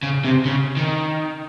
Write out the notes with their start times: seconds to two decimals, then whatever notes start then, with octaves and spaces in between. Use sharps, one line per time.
0.03 C#3
0.25 C3
0.45 C#3
0.77 D#3